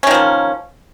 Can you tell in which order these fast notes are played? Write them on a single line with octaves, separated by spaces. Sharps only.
C#4 D#3 F3 A#3